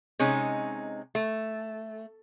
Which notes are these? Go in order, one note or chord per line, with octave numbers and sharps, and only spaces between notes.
C3 G#3 C#4 D#4
A3